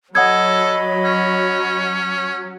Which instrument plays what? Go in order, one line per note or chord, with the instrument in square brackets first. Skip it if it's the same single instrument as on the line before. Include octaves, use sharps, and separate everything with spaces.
[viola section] F#3 [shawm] A4 [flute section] C#5 D#5 B5 [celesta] F#5 D#6 G#6
[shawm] C#4